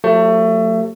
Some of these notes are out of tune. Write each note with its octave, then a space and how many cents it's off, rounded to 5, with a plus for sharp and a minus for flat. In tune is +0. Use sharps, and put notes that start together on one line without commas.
F#3 -40 A3 +25 G4 +0